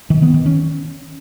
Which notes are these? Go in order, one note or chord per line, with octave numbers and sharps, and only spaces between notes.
D#3
B3
D#3
C#4